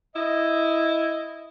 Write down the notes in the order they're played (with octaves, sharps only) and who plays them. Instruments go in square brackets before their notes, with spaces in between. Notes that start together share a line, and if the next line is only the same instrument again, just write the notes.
[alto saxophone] E4 [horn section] D#5